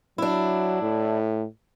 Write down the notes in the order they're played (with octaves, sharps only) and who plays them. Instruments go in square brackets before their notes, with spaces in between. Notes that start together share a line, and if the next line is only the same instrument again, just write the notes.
[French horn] F#3 [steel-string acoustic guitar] D4 E4
[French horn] A2